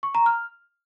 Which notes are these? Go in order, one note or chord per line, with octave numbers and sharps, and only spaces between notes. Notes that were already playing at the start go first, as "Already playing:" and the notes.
C#6
A#5
F6